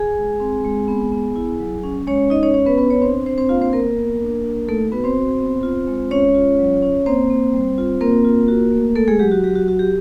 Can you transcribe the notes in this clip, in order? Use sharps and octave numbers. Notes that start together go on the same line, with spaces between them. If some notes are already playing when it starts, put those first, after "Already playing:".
Already playing: G#4 G#5
G#3
C4
G#3
B3
B3
E4
F#3
C#4
G#3 C#4 C#5
G#3 D#4 D#5
C#4 C#5
C#4 C#5
B3 B4
B3 D4 B4
C#5
C4 D4 C5
C4 D4 C5
C4 C5
A#3 F4 F5
C4 C5
A#3 B3 A#4
B3
D4
D4
A3 D#4 A4
B3 F#4 B4
C4 C5
F#4
B3
F4
G#3
G#3 C#4 C#5
F4
F#3
C#4
A#3 C4 C5
A#3
G3
F4
A#3 C4 A#4
F4
F#4
A3
A3 A4
G#3 G#4
F#3 G4
F#4
F#3 G4
F#4
F#4
G4